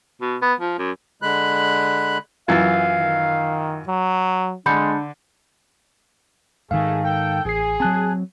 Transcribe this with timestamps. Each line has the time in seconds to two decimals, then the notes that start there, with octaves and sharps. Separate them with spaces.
0.21 B2
0.42 B3
0.60 F3
0.78 F#2
1.22 D3 G#3 B5 F#6
2.48 F#2 E3 F4 F5 A6
2.98 D#3
3.88 F#3
4.66 D3 G#3 D4 B5 G6 C#7
6.71 G#2 D#3 A3 G#4 F5
7.04 A4 G5
7.45 A1 G#4 C7
7.80 F#3 C4 G#5 A5 F#6